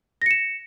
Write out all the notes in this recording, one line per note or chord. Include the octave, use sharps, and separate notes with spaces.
A#6 C#7 E7